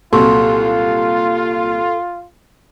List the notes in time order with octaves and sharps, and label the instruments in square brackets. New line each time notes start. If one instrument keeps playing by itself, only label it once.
[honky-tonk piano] C2 A#2 F#3 [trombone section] F4 [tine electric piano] A4 [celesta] C6 C#6